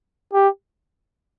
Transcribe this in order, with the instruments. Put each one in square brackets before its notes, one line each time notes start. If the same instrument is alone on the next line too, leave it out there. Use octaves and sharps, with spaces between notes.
[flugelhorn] G4